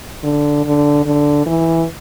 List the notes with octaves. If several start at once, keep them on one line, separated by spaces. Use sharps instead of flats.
D3
D3
D3
E3